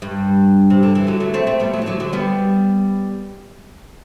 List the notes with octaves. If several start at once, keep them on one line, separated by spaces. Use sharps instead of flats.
G2
C3
D3
E3
D3 F#3
F#3 A3
A3 C4
A3 C4
G3 B3
F#3 A3
E3
D3 F#3
D3 F#3
G3 B3